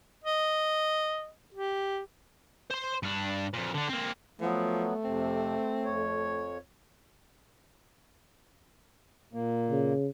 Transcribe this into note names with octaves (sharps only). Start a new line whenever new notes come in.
D#5
G4
C5 C6
G2 D4
F2 A#2
D3 D4
A#3 C4
F3 F#3 A3 B3
F2 C3 C4
F2 C#5
A#2 A#3
C#3